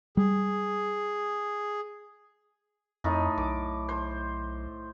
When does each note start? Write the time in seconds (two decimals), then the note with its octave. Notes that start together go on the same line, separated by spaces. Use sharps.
0.17 G3 G#4
3.04 F2 A2 D#4 D#5
3.38 B1 D6
3.89 C5